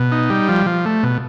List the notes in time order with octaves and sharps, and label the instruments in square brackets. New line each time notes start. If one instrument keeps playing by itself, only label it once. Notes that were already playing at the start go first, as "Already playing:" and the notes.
Already playing: [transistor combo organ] B2
D#4
G3
F3
F3
A3
B2